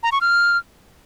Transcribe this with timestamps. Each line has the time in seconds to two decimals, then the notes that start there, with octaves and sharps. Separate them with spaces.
0.03 A#5
0.12 C#6
0.21 F6